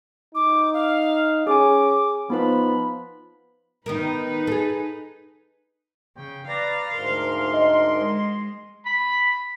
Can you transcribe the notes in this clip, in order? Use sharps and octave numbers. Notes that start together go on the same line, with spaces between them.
D#4 D6
F5
C#4 G#4 G#5 D6
F3 B3 D#4 B4 B5
D#3 B3 D#4 A#4 B4
G#4 A4
C#3 G5
B4 D5 F5 A#5
D2 G#2 A#4 C6
D#5
G#3
B5